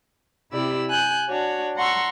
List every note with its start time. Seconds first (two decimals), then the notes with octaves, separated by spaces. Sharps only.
0.52 C3 E4 G4 D5 E6
0.89 G#5 F#6 G6
1.28 D4 F#4 C#5
1.76 F#5 A#5 C6 C#6 E6